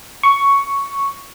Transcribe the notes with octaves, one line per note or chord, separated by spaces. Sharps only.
C#6